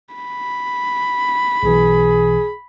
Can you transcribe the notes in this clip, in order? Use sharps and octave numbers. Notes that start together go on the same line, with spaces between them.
B5
B1 B2 E3 G#4